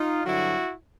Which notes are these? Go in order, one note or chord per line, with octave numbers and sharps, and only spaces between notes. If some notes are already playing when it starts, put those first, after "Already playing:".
Already playing: D#4 F4
G2 D3 F#3 E4 F#4